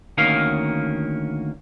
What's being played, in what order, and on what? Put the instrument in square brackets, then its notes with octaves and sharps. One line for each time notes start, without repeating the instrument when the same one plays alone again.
[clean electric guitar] D2 D#3 A#3 C#4 A#4 F5